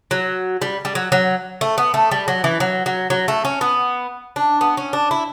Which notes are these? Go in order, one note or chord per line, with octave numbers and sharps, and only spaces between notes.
F#3
G3
G3
F#3
F#3
A3
B3
A3
G3
F#3
E3
F#3
F#3
F#3
A3
C#4
B3
D4
B3
C#4
D4
E4